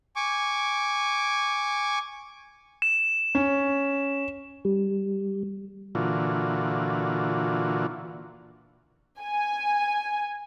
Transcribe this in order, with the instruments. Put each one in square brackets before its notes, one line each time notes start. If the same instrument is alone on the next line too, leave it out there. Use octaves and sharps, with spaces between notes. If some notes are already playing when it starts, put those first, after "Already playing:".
[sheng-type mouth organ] G#5 C#6 D6
[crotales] E7
[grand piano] C#4
[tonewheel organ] G3
[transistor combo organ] A#2 D3 E3 F4 F#4
[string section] G#5